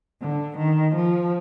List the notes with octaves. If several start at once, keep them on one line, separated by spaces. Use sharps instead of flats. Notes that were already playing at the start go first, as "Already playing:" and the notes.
D3
D#3
F3